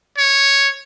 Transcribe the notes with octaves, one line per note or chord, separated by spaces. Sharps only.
C#5